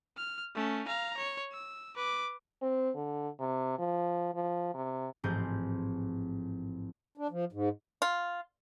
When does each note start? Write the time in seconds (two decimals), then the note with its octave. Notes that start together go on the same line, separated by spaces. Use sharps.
0.17 F6
0.55 A3 C#4
0.88 F5 A#5
1.17 C#5
1.52 E6
1.96 B4 D6
2.62 C4
2.96 D3
3.40 C3
3.79 F3
4.35 F3
4.75 C3
5.24 A1 G#2 F3 C4 G#4 G6
7.18 D4
7.31 F3
7.53 G#2
8.02 F4